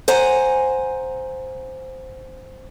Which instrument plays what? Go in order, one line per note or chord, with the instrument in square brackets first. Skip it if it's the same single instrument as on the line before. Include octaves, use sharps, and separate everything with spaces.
[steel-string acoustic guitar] C5 F#5 G#5 A#5